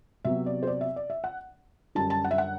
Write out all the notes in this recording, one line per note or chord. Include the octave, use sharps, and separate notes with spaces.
C3 F#3 B3 E5
D5
C5
D5
E5
D5
E5
F#5
F#2 D3 G3 D4 A5
A5
F#5
E5
F#5